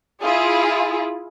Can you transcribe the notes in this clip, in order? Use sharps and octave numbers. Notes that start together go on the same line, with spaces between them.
E4 F4 G#4